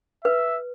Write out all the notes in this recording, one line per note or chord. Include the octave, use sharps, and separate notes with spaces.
B4 E5